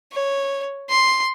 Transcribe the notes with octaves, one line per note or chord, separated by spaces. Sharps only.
C#5
C6